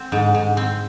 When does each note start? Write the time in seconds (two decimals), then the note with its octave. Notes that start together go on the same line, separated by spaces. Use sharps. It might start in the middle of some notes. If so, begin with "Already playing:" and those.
Already playing: C4
0.12 G#2
0.35 G#2
0.57 C4